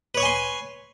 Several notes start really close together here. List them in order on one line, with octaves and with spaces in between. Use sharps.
B4 C#5 C#6 G#5 C6